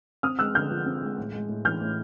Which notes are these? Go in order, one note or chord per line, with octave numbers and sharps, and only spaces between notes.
C4 D#6 F6
G#3 E6 F#6
D3 F6 G6
F3
C4
G#3
A2
G#3
A2
E3 F6 G6
A2